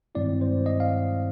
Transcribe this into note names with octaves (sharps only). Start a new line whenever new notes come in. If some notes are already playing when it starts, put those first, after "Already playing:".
G2 D#3 G#3 C4 E4 D5
C5
D#5
F5